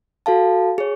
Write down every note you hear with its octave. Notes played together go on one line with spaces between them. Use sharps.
F#4 A4 F5 A5
G#4 C#5